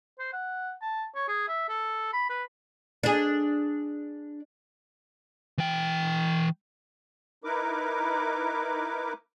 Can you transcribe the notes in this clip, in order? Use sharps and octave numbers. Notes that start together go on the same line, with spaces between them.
C5
F#5
A5
C#5
G#4
E5
A4
B5
B4
D4 G#4
E3 G5
D#4 E4 A#4 B4 D6